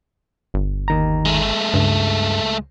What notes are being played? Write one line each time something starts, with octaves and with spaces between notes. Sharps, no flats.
G1
D#2 D#3 A#5
G#3 A3
C#2 G2